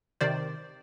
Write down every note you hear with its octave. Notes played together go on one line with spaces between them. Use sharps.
C3 D#3 C5 D5